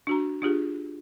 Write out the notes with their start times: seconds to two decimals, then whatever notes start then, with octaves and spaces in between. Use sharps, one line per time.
0.07 D4 F#4 A#5
0.42 D4 F4 G4 G#4